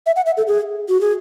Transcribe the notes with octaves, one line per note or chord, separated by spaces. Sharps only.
E5
F#5
E5
A4
G#4
F#4
G#4